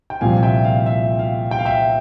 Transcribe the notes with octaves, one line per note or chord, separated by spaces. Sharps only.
G5
C2 A#2 F3 F5 G#5
E5 G5
F5
E5
F5
G5
F5
E5 G5